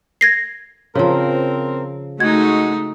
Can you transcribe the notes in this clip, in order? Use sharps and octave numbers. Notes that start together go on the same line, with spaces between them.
G#6 A#6 C7
C#3 F3 C4 A#4
G#3 A3 D#4 F#4 G#6